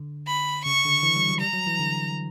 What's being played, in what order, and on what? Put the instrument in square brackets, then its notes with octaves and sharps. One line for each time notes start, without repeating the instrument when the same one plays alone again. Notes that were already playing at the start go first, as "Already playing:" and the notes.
Already playing: [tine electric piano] D3
[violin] B5
[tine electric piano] C#3 [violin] C#6
[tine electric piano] D3
E3
G3
F#3
[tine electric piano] G3 [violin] A#5
[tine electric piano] F#3
E3
D3